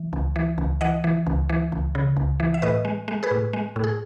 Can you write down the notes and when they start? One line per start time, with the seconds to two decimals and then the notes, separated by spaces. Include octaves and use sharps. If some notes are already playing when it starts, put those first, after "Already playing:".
Already playing: E3
0.13 C#2
0.36 E3
0.58 C#2
0.81 E3 D#5 F#5
1.04 E3
1.26 C#2
1.49 E3
1.72 C#2
1.95 C#3
2.16 C#2
2.40 E3
2.54 E5
2.62 A2 B4 D#5
2.85 G#3
3.08 G#3
3.23 G#4 B4
3.31 A2
3.53 G#3
3.76 A2
3.84 G#4